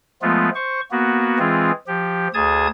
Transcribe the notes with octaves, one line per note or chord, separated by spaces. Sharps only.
F3 G#3 A3 B3 F4
C5 C#6
A#3 B3 F#4
E3 G#3 C4 F4 G#4
F3 G4
D2 G#4 A5 D#6 G#6